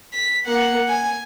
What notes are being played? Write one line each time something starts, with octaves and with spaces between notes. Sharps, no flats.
B6
A#3 F#5
G#5